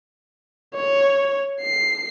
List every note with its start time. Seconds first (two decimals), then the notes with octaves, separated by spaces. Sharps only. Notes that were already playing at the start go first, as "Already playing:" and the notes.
0.75 C#5
1.61 C7